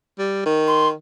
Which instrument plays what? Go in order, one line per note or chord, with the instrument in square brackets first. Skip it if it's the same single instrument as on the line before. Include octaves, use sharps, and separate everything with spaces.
[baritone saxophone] G3
D#3
[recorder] C6